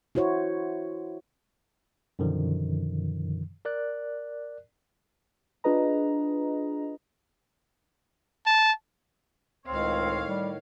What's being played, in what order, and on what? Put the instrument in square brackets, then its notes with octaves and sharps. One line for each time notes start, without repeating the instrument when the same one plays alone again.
[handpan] E4 F#4 C5 C#5
[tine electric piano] F#2 B2 D3 D#3 F3
A#4 D5 F#6
[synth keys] D4 F4 G#4 B4 D#5 A#5
[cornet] A5
[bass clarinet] C#2 [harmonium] A2 D#3 [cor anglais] C4 [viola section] C#5 F5
[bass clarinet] G3